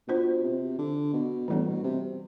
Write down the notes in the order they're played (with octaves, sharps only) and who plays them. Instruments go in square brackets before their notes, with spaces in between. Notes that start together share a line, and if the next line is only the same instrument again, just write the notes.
[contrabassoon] B2 [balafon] B3 D4 F4 C5
[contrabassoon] C3
D3
B2
[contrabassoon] A2 [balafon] E3 G3 B3 D4
[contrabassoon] B2
C3